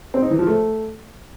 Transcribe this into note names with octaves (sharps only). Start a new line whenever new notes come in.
C4
D#4
E3
F3
A3